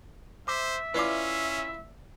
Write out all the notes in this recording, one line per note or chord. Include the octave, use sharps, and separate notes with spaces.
C5 E5 D6
C#4 E4 F4 B4 D5 F5 D6